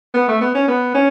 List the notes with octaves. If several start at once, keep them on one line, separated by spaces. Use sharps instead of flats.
B3
A3
B3
C#4
B3
C#4